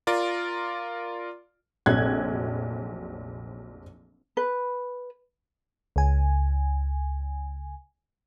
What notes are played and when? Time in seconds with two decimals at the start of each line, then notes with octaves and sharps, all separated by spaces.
0.07 F4 A#4 D5
1.86 F1 A#1 F#3 F#6 G#6
4.37 B4
5.96 C#2 G#5